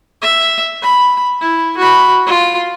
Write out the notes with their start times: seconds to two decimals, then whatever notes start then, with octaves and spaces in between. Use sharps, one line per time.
0.22 E5
0.82 B5
1.41 E4
1.77 F#4 B5
2.27 F4